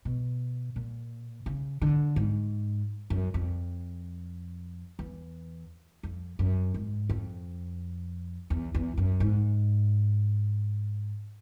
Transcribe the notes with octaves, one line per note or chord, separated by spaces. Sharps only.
B2
A#2
C#3
D3
G#2
F#2
F2
E2
F2
F#2
G#2
F2
E2
E2
F#2
G#2